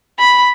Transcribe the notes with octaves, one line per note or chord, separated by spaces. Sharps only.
B5